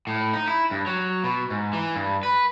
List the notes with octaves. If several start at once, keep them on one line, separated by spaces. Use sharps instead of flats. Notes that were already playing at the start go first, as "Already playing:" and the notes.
A2
D#4
E4
G2
F#3
B2
G#2
E3
G2
B4